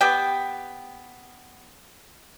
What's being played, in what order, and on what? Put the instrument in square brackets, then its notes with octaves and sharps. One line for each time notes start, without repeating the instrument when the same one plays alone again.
[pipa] B3 G4 G5